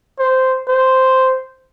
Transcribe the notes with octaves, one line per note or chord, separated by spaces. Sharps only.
C5
C5